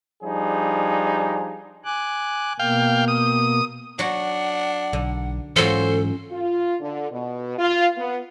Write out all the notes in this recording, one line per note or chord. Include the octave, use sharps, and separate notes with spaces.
F3 G3 D4 D#4 G#4
G#5 D6 F#6
B2 A#3 F5 G5
D#6
F#3 D4 F#4 F#5
B1 D3
G#2 E3 F#3 C#4 F4 A4 C5
F4
D3
B2
F4
B3